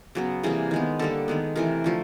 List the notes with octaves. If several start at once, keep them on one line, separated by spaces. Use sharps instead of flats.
C#3 F#3 B3
C3 E3 G3 A#3 G#4
D#3 G#3 B3
D3 G3 A#3 A4
D#3 G#3 B3
C3 E3 A3 A#4
D3 F3 A3